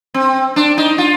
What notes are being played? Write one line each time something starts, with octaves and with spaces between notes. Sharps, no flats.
C4
D4
D#4
F4